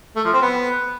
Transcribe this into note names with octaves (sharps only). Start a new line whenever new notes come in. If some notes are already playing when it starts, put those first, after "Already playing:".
A3
F3
C4
B3